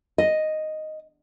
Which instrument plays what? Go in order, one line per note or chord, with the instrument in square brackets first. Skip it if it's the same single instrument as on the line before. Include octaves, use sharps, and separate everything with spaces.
[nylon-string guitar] D#5